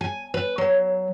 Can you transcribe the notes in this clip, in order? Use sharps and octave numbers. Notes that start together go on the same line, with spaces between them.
G#5
B4
F#3